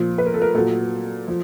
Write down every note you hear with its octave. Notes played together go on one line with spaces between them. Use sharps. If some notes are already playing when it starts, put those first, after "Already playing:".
Already playing: A#2 F3
B4
A#4
A4
A#4
A#2 F#3 A4
F3